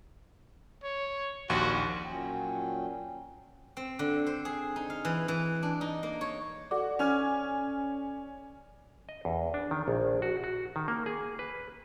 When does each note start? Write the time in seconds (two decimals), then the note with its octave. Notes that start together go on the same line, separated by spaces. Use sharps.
0.83 C#5
1.50 A#1 D#2 F#4 C6
2.06 A#2 F#3 C#4 G5
3.77 C4
3.99 D3
4.27 C5
4.45 G#4
4.76 D#4
4.90 F5
5.05 E3
5.28 E3
5.63 D4
5.81 D#4
6.03 A#3
6.21 C#5
6.71 F#4 A4 D5 D6
6.99 C#4 G#5 F6
9.09 D#5
9.25 E2
9.54 D4
9.71 D#3
9.88 A#1
10.22 F#4
10.44 F#4
10.76 D#3
10.88 A#3
11.06 G#4
11.39 B4